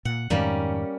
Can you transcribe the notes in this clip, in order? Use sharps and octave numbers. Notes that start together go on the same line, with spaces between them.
A#2 F#5
F2 G#2 D#3 G3 A#3 C#4